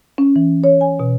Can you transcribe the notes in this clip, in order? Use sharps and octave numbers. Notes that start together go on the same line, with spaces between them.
C#4
E3
C#5
G#5
B2